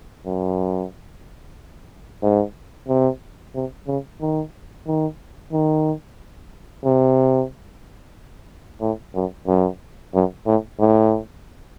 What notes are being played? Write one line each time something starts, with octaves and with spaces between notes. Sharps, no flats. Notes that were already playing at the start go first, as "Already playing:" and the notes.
F#2
G#2
C3
C3
C#3
D#3
D#3
D#3
C3
A2
F#2
F#2
F#2
A2
A2